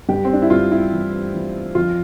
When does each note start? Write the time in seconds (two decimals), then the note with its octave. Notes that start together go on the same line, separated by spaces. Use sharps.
0.09 G2 G4
0.25 C4
0.33 D4
0.42 E4
0.50 G2 F4
0.72 E4
0.92 E3
1.34 E3
1.75 F2 F4